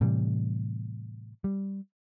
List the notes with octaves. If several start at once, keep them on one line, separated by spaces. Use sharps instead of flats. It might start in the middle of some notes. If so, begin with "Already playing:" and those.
A2 C3 E3 G3
G3